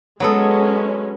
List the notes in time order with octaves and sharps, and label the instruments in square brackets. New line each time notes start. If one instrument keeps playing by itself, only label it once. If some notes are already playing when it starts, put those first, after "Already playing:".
[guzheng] F#3 B3 A4 [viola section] G#3 C#4